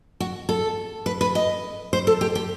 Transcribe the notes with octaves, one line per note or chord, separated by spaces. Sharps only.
F#4
A4
B4
B4
D#5
C5
A4
G4
G4